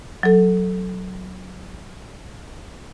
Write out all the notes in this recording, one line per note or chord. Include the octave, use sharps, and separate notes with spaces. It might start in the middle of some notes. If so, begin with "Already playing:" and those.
F#3 A4